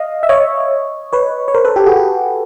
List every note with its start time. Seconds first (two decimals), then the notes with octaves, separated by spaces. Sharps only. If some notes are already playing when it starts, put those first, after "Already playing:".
Already playing: D#5 F5
0.23 E5
0.29 C#5 D#5
1.13 B4 C#5
1.48 C#5
1.54 A#4 C5
1.65 A4 B4
1.76 G4 A4
1.86 F#4 G#4
1.97 G4